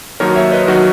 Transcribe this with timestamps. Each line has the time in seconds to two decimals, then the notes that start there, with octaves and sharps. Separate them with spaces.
0.20 D#2 D#3 F#3 A#4 C#5
0.36 C#5 E5
0.52 B4 D#5
0.68 D#3 F#3 F#4 A#4